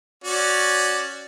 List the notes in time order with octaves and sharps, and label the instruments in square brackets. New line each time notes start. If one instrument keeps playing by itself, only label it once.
[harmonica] C#4 F#4 D5